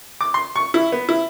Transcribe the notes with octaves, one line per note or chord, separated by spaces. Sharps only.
D6
C6
C#6
E4
B3
E4